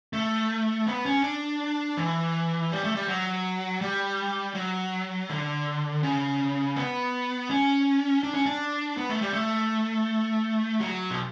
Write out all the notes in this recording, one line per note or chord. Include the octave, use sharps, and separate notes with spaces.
A3
B3
C#4
D4
E3
G3
A3
G3
F#3
G3
F#3
D3
C#3
B3
C#4
D4
C#4
D4
B3
A3
G3
A3
F#3
B2